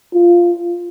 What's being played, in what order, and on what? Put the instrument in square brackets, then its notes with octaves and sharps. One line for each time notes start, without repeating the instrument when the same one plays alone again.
[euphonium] F4